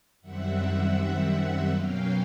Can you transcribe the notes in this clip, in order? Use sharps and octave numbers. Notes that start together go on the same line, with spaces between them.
F#2 D#3 G3 C4 E5 F#5
E5 F#5
E5 F#5
B2 F#3 A#3 C#4 F5 G5